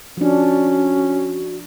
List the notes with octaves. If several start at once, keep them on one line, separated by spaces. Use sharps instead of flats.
F3 C#4 D4 F#4